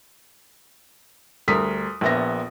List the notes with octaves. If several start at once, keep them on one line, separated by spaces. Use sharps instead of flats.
D2 G3 A#4 D#6 B6
A#1 A#2 B3 E5 A#6